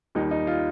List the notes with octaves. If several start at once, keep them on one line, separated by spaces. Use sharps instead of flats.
D#2 D#3 G3 D#4
D#4
F4